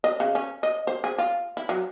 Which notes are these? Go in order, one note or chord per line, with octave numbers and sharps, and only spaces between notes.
D#5
C#3
C#4
D#5
C5
G#4
F4
E4
F#3